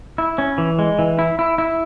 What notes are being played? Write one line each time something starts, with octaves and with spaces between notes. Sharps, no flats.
E4
C#4
E3
G#3
E3
E4
E4
E4